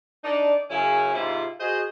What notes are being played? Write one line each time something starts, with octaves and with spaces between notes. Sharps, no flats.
D4 D#4 D5
F#2 C#3 C#4 E4 G#4 C#5
G#2 C3 E4 F4
F#4 G#4 C5 D#5